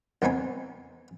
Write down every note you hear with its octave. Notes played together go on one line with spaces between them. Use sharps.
E2 B3 C4 D#4 G#5 B5